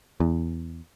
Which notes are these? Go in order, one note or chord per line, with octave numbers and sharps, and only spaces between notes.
E2